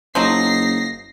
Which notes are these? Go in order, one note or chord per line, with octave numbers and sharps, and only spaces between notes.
F#1 F3 F#3 D#4 A#6 C7